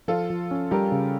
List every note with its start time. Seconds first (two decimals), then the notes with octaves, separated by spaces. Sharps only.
0.08 F3 F4 A4
0.30 F3
0.51 C#4
0.71 G3 G4 A#4
0.92 C#3